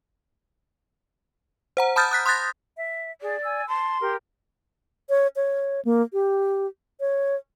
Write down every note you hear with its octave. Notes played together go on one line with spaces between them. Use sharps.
C5 F#5 A#5
A5 B5 D#6 F6 G6 A6
D#6 F#6 B6
C6 D#6 F#6 G6 A6 A#6
E5
G#4 D5
G#5 E6
A5 C6
G4 A#4
C#5
C#5
A#3
G4
C#5